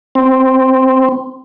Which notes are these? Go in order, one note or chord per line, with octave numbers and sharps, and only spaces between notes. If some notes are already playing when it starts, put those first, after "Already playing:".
C4